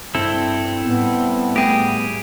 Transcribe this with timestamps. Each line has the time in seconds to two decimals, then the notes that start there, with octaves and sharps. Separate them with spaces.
0.15 G2 C4 E4 A4
0.84 A2 G3 B3
1.56 A3 G4 G#4 G5 A#6